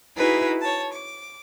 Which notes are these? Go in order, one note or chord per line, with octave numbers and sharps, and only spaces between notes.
D#4 E4 F#4 G#4 B4
C#5 A5
D6